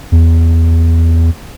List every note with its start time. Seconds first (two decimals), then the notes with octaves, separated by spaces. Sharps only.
0.12 E2